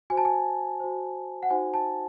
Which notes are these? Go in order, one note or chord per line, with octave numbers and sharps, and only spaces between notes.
F#4 C5 G#5
A5
G#5
F#4 C5
F#5
D#4 F#4 C5 G#5
A5